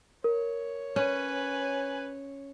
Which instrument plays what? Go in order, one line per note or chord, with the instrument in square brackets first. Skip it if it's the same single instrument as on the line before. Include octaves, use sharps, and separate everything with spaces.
[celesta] A#4 [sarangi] C#5
[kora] C#4 [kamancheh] B4 G#5